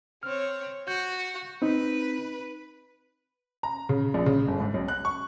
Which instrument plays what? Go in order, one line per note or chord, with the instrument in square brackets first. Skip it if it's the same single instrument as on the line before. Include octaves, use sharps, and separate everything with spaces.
[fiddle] C4 C#5 [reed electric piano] F6
[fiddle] F#4 [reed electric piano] G6
[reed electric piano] C4 D#4 [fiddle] B4
[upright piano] A#5
C#3
A#1
C#3
G1
G#2
B1
F#6
C#6